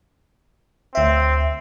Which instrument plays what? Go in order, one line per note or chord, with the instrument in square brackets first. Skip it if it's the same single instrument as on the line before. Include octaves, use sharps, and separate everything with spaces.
[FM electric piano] D2 E5 [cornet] C4